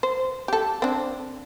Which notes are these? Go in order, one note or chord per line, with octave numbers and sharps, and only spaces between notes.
C5
G4 A4
C4 D4